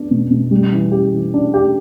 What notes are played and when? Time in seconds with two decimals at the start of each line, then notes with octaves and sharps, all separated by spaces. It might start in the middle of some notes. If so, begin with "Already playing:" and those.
Already playing: B3 D4
0.11 B2
0.30 B2
0.51 G3
0.72 E3
0.92 G4
1.12 E3
1.34 D4
1.54 G4